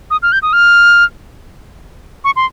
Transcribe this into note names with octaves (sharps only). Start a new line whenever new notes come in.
D#6
F6
G6
D#6
F6
C#6
C6